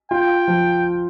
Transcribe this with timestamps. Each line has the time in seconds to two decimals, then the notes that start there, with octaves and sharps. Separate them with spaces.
0.11 F4 G5
0.47 F3